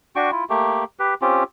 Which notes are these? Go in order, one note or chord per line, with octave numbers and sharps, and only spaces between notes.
D4 F#4 G5 C#6
E4 F4
A3 A#3 G4
G4 B4
C4 C#4 F4 G4